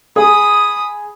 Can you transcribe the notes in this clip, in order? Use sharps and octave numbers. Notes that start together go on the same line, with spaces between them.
G#4 B5 D#6